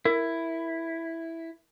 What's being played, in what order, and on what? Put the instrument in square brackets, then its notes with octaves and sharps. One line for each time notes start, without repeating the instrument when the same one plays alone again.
[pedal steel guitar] E4 [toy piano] A#4